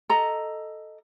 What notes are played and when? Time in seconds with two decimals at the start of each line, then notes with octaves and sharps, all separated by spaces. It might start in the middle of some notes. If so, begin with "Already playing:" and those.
0.09 A4 D#5 A#5